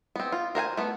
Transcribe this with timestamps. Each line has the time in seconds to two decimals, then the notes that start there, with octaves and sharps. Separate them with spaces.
0.16 B3 C4
0.32 F4
0.55 A#4 C5 F#5 G#5
0.77 A3 B3